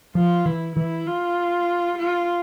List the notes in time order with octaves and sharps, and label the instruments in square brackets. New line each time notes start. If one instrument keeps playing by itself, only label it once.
[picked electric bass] F3 [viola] F4
[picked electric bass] E3 [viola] E4
[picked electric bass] E3 [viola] E4
[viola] F4
F4